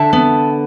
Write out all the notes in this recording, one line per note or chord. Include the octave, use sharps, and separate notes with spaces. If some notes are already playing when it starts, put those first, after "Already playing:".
Already playing: D3 E5 A5
B3